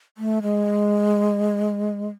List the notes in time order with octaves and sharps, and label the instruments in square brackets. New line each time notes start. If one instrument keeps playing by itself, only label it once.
[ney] A3
G#3